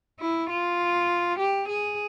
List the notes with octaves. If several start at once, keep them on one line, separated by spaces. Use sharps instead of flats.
E4
F4
G4
G#4